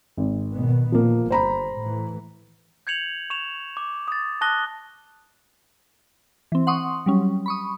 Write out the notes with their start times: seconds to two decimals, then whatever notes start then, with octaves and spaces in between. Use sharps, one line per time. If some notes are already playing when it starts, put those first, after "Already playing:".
0.17 G#1
0.51 B2 D#3 B3
0.92 A#2 F3 A#3
1.30 G1 C5 A#5 B5
1.79 A2 E3
2.87 G6 G#6 C#7 F7 F#7
3.30 C#6 E7 F7
3.77 D6
4.08 D#6 A6
4.41 A5 C#6 D#6 F#6 A#6 G7
6.52 E3 C4
6.67 F#5 C6 C#6 D#6
7.06 F#3 G3 C#4
7.46 B5 C#6 D#6